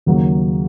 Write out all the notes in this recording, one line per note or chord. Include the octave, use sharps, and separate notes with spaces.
D#2 C#3 F#3 A#3